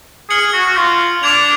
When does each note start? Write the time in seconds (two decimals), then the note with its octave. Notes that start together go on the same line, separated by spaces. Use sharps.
0.30 G#4 F6 G#6 C#7 F#7
0.41 G#4
0.53 F#4
0.65 F#4
0.77 F4
1.23 D4 D6 G#6 D7 F7